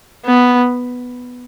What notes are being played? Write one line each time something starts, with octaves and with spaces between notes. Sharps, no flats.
B3